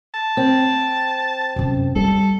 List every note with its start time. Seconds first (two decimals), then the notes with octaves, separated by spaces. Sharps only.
0.14 A5
0.37 C4
1.56 F#2 C3
1.96 G3 B3 A4